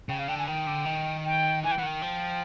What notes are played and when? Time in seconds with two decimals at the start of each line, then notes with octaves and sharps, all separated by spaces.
0.09 C#3 G5
0.19 F5
0.28 D3 G5
0.38 G#5
0.47 D#3 G5
0.67 D3
0.86 D#3
1.25 G5
1.64 E3 G#5
1.71 G5
1.78 E3 F#5
1.83 D#3 G5
2.02 F3